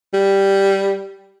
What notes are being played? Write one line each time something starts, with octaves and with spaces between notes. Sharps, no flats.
G3